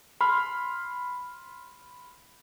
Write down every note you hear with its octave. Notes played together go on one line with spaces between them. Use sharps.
B5 C6 F6